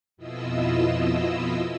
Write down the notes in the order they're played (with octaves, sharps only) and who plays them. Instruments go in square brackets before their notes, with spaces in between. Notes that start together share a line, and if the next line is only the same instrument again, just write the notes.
[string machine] F2 B2 E4 F4 D#5 E6